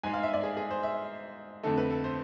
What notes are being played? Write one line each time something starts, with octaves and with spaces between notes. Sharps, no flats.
G#2 G#3 G#5
F5
E5
D5
G#4
G#4
C5
E5
F2 D3 A3 A4
B4
A4
C5